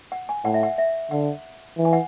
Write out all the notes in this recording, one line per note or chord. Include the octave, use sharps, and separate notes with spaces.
F#5
G#5
A2 F#5
E5
F#5
E5
D3 F#5
E3
G#5
F#5